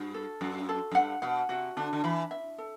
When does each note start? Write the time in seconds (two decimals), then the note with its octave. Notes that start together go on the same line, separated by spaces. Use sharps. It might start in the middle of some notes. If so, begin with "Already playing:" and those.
Already playing: G2 F#4
0.14 A4
0.41 F#2 F#4
0.69 A4
0.91 F#2
0.95 G2 F#5
1.22 B2 F#5
1.49 C3 F#4
1.77 D3 D4
1.93 D3
2.04 E3 B5
2.31 E5
2.58 A4